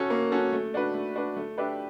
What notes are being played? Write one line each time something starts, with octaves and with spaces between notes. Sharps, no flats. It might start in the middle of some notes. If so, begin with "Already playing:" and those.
Already playing: C#4 F#4 A4
A#3
C#4 F#4 A4
A3
D4 F#4 B4
A3
D4 F#4 B4
A3
D4 G4 B4 E5